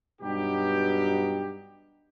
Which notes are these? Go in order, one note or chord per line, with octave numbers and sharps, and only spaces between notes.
G2 B2 F#3 D#4 G4